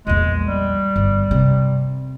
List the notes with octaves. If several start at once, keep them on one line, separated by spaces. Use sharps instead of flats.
A#1 E2 G#3
G3
G1
C3